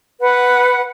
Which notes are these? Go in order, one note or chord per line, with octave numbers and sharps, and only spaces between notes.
B4 F#5